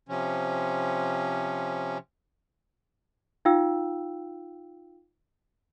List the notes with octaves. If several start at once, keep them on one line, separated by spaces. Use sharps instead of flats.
C3 F3 C#4
D#4 F4 F5 G5 E6